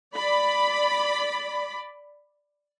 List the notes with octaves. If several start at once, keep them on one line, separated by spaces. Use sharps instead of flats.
D5 B5